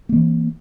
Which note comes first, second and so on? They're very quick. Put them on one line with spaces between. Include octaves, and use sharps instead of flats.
A#3 E3 C4